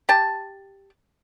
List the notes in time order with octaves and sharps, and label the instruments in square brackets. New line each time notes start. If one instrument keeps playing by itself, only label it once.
[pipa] G4 A5